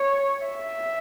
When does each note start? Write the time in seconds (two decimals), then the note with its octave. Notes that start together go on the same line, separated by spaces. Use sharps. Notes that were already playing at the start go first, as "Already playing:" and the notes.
Already playing: C#5
0.46 E5